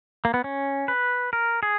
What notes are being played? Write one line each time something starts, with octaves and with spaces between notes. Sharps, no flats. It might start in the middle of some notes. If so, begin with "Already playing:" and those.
A#3
B3
C#4
B4
A#4
G#4